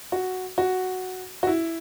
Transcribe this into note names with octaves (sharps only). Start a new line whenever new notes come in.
F#4
F#4
F#4
E4